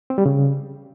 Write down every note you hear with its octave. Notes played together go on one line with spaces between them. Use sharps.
C4
G3
C#3